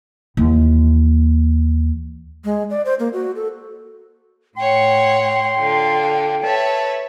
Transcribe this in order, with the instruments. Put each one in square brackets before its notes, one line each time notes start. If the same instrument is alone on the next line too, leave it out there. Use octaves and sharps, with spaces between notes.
[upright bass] D#2 E3
[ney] G#3
D5
C5
A#3
F#4
A4
[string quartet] A2 C#5 F#5 [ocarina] G5 [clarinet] C6
[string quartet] D3 D4 F4
[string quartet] B4 C#5 E5 [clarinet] A5